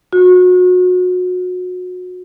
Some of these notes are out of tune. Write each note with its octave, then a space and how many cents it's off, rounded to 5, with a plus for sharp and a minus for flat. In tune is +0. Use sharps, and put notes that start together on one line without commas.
F#4 -30